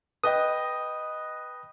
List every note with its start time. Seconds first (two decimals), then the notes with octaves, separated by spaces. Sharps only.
0.24 B4 D#5 G5 D#6